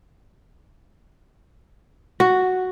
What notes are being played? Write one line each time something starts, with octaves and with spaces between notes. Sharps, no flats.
F#4